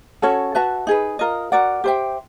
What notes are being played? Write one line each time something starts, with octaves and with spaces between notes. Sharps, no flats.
C#4 F#4 A4 C#5
F#4 B4 E5 A5
D#4 G#4 B4
F4 A#4 D#5
F#4 A#4 D5 F#5
G4 C5 E5 G5